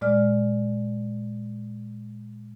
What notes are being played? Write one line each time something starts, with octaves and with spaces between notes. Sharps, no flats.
A#2 G#3 D5 F6